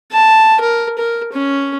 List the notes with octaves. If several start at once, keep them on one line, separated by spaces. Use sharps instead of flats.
A5
A#4
A#4
C#4